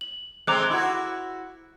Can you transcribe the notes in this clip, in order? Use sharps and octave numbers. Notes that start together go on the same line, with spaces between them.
F#7
G#3 A3 C4 A#5 D6 F#6
E4 F#4